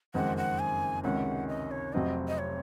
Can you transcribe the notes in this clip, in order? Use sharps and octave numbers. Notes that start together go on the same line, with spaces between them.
F#1 F2 D#3 G#3 C4 F#5
F#5
G#5
C#2 C3 D#3 G#3 C#4 F#5
D#5
C#5
F1 F2 C3 F#3 C4 D#5
D#5
C#5